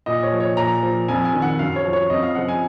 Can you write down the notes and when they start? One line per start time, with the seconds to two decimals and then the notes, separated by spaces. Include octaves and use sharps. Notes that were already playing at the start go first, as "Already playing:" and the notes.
0.06 A#2 D#5
0.23 C#5
0.32 F3
0.40 C#5
0.57 A#2 A#5
0.83 F3
1.08 F2 G#5
1.25 G#5
1.33 D#3
1.42 F#5
1.59 F#2 F5
1.76 C#5
1.85 F3
1.93 C#5
2.10 F2 D#5
2.23 F5
2.35 C#3 F3 F#5
2.48 G#5